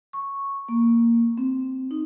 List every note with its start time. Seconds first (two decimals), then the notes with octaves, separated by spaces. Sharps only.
0.13 C#6
0.69 A#3
1.38 C4
1.91 D#4